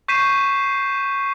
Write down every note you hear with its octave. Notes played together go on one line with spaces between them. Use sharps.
C#6 G6 B6 C7 D#7 E7